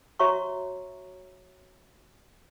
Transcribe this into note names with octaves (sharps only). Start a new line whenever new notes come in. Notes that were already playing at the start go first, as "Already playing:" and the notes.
F#4 C#5 E5 A#5 C#6